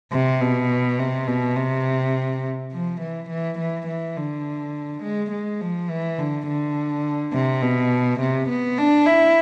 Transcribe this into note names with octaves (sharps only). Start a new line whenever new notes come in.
C3
B2
C3
B2
C3
F3
E3
E3
E3
E3
D3
G#3
G#3
F3
E3
D3
D3
C3
B2
C3
B3
D4
E4